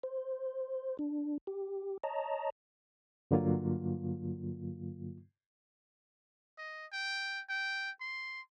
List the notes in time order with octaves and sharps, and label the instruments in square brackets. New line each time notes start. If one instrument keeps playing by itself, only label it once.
[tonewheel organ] C5
D4
G4
C#5 D#5 A5 A#5
[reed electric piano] G2 D3 F#3 A#3 F4
[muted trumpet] D#5
G5
G5
C6